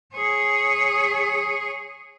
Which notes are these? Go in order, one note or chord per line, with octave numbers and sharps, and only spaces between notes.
G#4 C#5